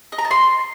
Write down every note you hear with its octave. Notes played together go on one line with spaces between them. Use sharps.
D#5
A#5
A5
C6